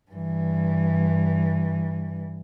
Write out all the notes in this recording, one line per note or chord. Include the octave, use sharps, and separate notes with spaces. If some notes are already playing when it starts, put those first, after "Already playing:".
G2 E3